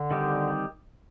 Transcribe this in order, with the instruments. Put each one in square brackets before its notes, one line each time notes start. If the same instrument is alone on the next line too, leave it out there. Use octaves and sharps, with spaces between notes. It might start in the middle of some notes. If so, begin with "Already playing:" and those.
Already playing: [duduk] D3
[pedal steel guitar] D#3 G3 C4 D#4 G4